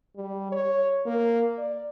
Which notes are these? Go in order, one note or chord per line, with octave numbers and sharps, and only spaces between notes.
G3
C#5
A#3
D5